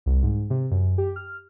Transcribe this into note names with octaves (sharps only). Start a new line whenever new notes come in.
C2
G#2
C3
F#2
G4
F6